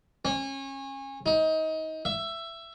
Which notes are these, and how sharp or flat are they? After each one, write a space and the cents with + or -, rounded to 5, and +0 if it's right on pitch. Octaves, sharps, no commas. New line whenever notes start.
C#4 -30
D#4 +25
E5 +15